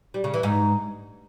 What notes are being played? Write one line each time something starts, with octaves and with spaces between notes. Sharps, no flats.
G3
C#3
E3
G#2